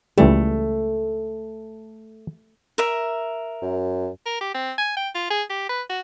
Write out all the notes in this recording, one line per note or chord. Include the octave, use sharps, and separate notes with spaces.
C#2 E3 G3 A3
A#4 E5
F#2
A#4
G4
C4
G#5
G5
F4
G#4
G4
B4
F#4